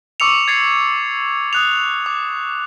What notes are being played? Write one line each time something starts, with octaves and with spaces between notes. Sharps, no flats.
C#6 D6 E6 C#7 F7
G#6 A6 C7 C#7
D#6 F#6 F7
D6